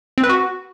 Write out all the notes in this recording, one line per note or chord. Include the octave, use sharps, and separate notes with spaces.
C4
B4
F#4